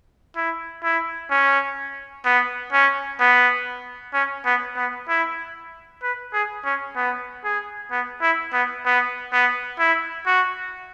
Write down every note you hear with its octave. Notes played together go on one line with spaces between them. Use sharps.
E4
E4
C#4
B3
C#4
B3
C#4
B3
B3
E4
B4
G#4
C#4
B3
G#4
B3
E4
B3
B3
B3
E4
F#4